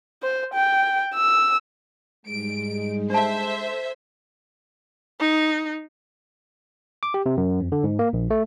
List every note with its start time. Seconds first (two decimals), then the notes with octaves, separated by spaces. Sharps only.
0.23 C5
0.54 G5
1.15 E6
2.25 G#2 G3 G#3 D#4 D7
3.10 D4 A4 C5 E5 A5 G#6
5.20 D#4
7.03 D6
7.14 G4
7.26 C3
7.37 F#2
7.61 F2
7.72 D3
7.84 G#2
7.99 A#3
8.13 A#1
8.30 A3